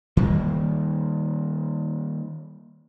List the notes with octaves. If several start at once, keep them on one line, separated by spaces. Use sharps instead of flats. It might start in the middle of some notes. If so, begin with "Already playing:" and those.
D#3 G3 A3 A#3